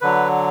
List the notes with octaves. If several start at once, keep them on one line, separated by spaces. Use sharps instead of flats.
D3 F#3 B4